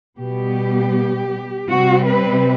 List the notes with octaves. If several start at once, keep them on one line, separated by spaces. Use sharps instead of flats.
B2 G3 B3 G4
C3 G3 C4 F#4
B4